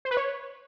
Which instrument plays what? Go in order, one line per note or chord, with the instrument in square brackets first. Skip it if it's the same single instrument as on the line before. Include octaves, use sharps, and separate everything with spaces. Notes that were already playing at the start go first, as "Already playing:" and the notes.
[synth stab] C5
B4
C#5